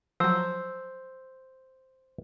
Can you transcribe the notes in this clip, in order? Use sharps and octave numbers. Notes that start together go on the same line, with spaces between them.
F3 F#3 C5 E6